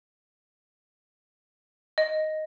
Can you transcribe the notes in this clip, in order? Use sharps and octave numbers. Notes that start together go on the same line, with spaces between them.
D#5